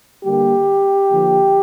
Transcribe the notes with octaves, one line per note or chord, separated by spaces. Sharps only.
D3 G3 A#3 G4
D3 F3 A#3